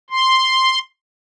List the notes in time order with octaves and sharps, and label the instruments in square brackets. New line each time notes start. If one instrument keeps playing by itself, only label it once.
[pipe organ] C6